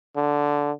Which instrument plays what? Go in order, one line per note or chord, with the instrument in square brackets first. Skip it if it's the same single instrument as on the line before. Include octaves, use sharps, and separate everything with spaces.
[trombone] D3